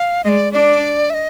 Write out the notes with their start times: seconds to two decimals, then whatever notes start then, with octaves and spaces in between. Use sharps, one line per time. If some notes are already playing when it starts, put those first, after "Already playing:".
Already playing: F5
0.24 G#3 D#5
0.29 D5
0.53 D4 D5
1.10 E5
1.14 D#5